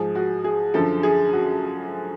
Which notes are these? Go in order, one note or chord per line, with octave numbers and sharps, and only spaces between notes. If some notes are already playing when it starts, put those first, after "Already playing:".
Already playing: G#2 F3 G#4
F#4
G#4
F#2 D3 F3 A4
G#4
F#4